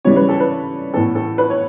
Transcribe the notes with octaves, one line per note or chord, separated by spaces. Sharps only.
C#3 E3 G3 C#4 C#5
B4
A4
B4
A2 E3 B3 A4
A4
B4
C#5